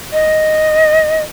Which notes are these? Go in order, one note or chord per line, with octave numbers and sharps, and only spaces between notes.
D#5